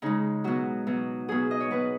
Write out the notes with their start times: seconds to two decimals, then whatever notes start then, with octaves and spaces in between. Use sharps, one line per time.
0.02 C#3 G#3 D#4
0.44 B2 F#3 F#4
0.87 B2 F#3
1.28 B2 F#3 G#4
1.51 D#5
1.60 C#5
1.71 B2 F#3 B4